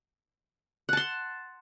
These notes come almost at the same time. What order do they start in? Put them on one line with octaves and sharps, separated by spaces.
F#5 A5 C6